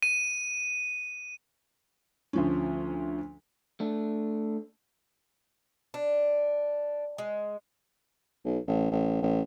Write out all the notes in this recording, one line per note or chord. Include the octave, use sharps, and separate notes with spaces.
D#7
D2 F3 C#4
A3 D4
D4
G#3
B1
A1
A1
A1